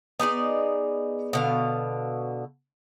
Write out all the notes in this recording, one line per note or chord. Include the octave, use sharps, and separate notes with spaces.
B3 D#4 G#4 D5
B2 D3 F5